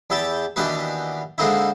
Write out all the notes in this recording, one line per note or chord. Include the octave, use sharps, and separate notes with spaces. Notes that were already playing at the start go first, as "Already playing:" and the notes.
E2 E4 G4 G5 A5
D#2 B2 E3 D4 G4 B4
D3 G#3 A#3 C4 D#4 E4